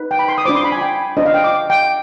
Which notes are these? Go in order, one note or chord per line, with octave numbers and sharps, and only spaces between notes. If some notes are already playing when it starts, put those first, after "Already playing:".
Already playing: D#4 B4
G5
B5
C6
D#6
D4 F4 C5 D6
C6
B5
G#5
G5
D4 F4 C5 D#5
F5
G5
D6
G5